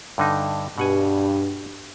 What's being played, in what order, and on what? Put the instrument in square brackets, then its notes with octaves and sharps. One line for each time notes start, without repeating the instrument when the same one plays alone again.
[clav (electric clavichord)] G2 D3 D#4
[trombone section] G2 [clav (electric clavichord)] B2 F#5 G#5